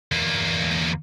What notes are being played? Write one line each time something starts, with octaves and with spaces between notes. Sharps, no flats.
E2 A#3